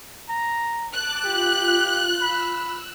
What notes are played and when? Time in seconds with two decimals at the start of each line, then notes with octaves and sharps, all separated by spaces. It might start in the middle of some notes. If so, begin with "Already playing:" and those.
0.29 A#5
0.93 A5 D6 F#6
1.24 F4 G4
2.22 B5 E6